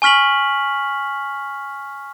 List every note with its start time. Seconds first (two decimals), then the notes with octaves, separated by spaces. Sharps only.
0.02 G#5 C#6 F6 B6 F#7